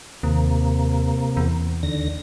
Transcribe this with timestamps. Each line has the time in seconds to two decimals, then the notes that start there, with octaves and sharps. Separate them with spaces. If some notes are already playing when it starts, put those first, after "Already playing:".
0.23 D#2 C3 A#3
1.37 E2
1.83 D#2 D3 A#6